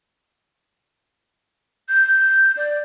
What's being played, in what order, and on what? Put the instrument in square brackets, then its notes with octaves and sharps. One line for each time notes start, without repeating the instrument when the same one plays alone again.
[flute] G6
D5